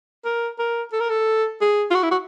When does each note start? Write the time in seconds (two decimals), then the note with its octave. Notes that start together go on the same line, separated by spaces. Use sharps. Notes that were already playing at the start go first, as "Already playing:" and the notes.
0.25 A#4
0.59 A#4
0.93 A4
1.00 A#4
1.10 A4
1.61 G#4
1.91 F4
1.95 F#4
2.03 E4
2.11 F#4